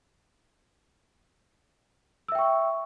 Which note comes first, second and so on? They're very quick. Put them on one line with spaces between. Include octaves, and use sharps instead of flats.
E6 E5 G5 C#6